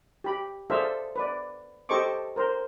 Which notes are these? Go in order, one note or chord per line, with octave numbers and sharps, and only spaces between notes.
G4 B5
G#4 A4 C5 D5 E5 F5
B4 D5
G4 A4 C5 D#5 C#6 D6
A#4 C5